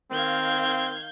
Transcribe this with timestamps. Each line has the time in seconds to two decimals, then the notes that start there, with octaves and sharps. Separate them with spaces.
0.11 D#3 C4 F5 G6 G#6